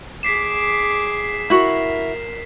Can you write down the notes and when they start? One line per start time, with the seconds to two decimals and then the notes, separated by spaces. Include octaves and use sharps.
0.23 G#4 D6 B6 C7 E7
1.50 E4 F#4 A#4